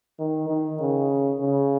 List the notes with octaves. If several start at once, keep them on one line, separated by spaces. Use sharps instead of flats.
D#3
D#3
C#3
C#3